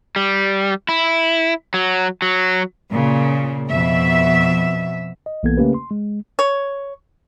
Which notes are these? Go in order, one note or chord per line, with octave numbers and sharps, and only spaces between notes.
G3
E4
F#3
F#3
A#2 C#3
F2 B2 E5
D#5
B1 E3 A#3 B3 A4 G#6
C#3 A3 A#3 C#4 G4 B4
C6
G#3
C#5